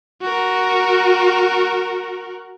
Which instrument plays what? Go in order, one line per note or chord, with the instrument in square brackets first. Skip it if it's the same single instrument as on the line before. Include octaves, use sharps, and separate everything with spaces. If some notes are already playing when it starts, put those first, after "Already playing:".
[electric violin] F#4 A#4